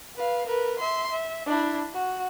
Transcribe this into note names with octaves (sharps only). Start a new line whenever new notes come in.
B4 F5
A#4 B4
E5 C6
E5
D4 E4
F#4